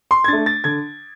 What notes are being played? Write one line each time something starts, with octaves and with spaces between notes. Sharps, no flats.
C6
G#6
A3 D4 A6
A6
D3 G#6